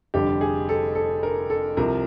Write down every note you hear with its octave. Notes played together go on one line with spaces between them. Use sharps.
F1 F2 D3 G3 G4
G#4
A4
A4
A#4
A4
C2 C3 F3 A#4